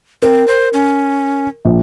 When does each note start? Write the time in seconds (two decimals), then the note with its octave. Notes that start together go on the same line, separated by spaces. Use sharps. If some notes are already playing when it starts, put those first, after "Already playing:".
0.22 C4 A#4
0.48 C5
0.73 C#4
1.65 A#1